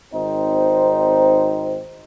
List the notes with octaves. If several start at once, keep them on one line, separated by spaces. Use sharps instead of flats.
G#1 C4 D#4 C5